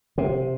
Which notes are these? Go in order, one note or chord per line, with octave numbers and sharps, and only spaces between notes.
C3